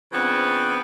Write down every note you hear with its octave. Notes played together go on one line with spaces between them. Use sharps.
C#3 F3 B3 C4 D4